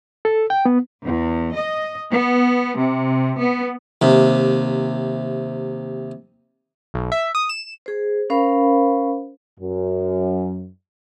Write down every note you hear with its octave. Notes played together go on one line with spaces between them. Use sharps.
A4
G5
B3
E2
D#5
B3
C3
B3
D#2 C3
B1
E5
D#6
E7
G#4 C5
C#4 A#4 C5 F5 B5
F#2